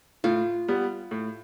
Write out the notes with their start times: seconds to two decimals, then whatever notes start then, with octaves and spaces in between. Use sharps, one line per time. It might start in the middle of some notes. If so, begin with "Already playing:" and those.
0.24 A2 F4
0.68 G3 B3
1.11 A2